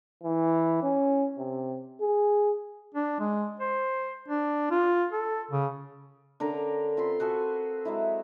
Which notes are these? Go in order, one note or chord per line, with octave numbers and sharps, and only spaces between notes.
E3
C#4
C3
G#4
D4
G#3
C5
D4
F4
A4
C#3
D3 C#4 A#4 A#5
C4 F4 B5 C6
F#4 G#4 A4 F#5
F#3 G#3 E4